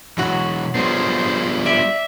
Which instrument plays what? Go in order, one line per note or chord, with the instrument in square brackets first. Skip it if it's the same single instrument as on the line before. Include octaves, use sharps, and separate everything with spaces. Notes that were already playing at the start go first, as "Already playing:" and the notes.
[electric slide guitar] B2 E3 [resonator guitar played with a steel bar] F#3 F#4
[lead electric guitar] G3 B3 [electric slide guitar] D4 F4 G#4 [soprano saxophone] C5
[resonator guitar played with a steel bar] D5 [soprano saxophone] E5